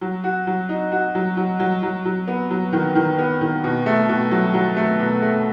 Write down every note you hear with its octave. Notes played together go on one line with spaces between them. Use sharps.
F#3
F#4
F#3
D#4
F#4
F#3
F#3
F#3
F#3
F#3
B3
F#3
D#3
D#3
B3
D#3
B2
A3
B2
F#3
F#3
A3
B2
A3